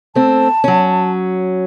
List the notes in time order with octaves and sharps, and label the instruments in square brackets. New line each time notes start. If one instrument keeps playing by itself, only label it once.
[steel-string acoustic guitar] A3 C4 [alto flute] A5
[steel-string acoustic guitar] F#3 C#4